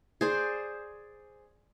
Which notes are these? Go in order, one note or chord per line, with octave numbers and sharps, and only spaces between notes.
G#4 C5 D5